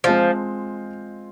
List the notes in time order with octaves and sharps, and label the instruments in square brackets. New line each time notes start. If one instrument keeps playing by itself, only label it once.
[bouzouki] F3 [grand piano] G#3 C4 F4 C5